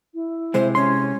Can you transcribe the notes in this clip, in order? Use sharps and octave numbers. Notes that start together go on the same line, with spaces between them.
E4
C3 G#3 C4 C5
C#4 C6